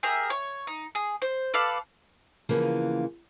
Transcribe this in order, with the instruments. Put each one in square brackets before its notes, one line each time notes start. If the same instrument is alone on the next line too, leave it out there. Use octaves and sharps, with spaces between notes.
[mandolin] G4 G#4 A#4 E5
C#5
D#4
G#4
C5
A4 B4 D5 F5
[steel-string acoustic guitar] C#3 E3 F3 A#3 B3